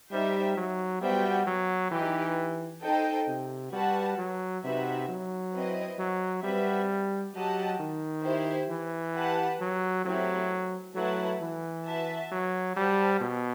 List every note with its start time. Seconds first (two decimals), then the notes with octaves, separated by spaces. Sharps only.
0.11 G3 D#4 G4 C5 E5 G5
0.57 F#3
1.01 G3 B3 F#4 C5 E5 G5
1.47 F#3
1.91 E3 D#4 G4 B4
2.83 D#4 A4 C5 D#5 G5
3.27 C3
3.72 G3 F#4 B4 F#5 A5
4.18 F#3
4.64 C3 D#4 F#4 B4 E5
5.09 F#3
5.53 C4 E4 B4 D#5
5.99 F#3
6.43 G3 C4 F#4 B4 E5
7.35 F#3 G4 D#5 F#5 A5
7.79 D#3
8.24 E4 G4 C5
8.69 E3
9.15 G4 B4 F#5 A5
9.60 F#3
10.05 F#3 A3 C4 E4 G4
10.95 F#3 A3 E4 B4 F#5 A5
11.41 E3
11.85 F#4 B4 E5 A5
12.32 F#3
12.76 G3 G4 C5 F#5 A5
13.21 B2